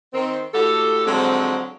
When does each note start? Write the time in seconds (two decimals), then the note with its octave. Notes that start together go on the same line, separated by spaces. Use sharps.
0.14 D#3 C4
0.54 A2 F#4 G4 A4
1.07 D3 F3 F#3 G#3 C4